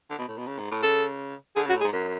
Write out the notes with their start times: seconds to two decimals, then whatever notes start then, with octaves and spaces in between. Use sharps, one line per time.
0.10 D3
0.19 B2
0.28 A2
0.38 B2
0.47 C#3
0.58 G#2
0.72 A2
0.83 C#3 A4
1.56 D3 G#4
1.66 C#3
1.69 F#4
1.74 A2
1.81 G#4
1.84 G#2
1.93 F#2